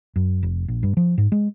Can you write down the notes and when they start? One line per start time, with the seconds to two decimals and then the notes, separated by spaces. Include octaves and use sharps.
0.16 F#2
0.43 F1
0.68 A#1
0.83 G2
0.97 F3
1.18 G#2
1.32 G#3